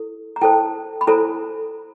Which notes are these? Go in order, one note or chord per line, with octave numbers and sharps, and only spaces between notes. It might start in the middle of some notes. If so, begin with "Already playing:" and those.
Already playing: E4 A4
A#5
E4 A4 C5 G5 A5
B5
E4 A4 C5 G#5 A#5